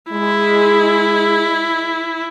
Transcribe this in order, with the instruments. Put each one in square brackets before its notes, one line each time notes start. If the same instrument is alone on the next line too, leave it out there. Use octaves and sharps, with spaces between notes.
[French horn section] G#3 [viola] E4